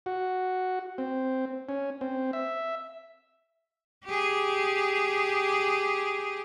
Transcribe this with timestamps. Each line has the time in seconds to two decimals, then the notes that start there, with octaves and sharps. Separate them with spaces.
0.06 F#4
0.98 C4
1.69 C#4
2.01 C4
2.33 E5
4.05 G4 G#4